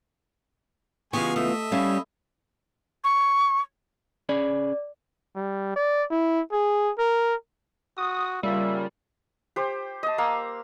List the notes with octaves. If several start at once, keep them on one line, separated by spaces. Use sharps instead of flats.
C#3 E3 G#3 B3 F4 G4 G#5 C#6
A3 D#5 E5
G3 C#4 E4 F5
C#6
C#4 G#4 D5 B5
G3
D5
E4
G#4
A#4
F#4 D#6
C#3 G3 A#3 F4 E5
G4 C5
D#5 A5
A#3 F5 A#5 E6